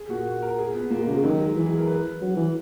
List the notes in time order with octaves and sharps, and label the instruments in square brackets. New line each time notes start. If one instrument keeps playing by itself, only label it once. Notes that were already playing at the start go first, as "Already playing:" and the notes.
Already playing: [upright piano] G#4
[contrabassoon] A#2 [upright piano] F#4
[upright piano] F#4
A#4
G#4
B3
[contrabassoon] A#2 [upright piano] A#3
[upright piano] G#3
[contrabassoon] C#3 [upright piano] A#3
[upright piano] G#3
[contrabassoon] D#3 [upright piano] F#3
[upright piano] G#3
[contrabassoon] E3 [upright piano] E4
[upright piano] G#4
A#4
B4
[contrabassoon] F#3
E3